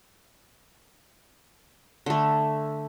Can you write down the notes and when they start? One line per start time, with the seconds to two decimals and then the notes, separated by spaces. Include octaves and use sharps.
2.06 D3 A3